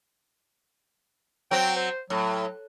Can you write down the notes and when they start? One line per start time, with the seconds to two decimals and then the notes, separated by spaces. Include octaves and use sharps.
1.51 F#3 C4 G5
1.76 C5
2.10 A2 F#3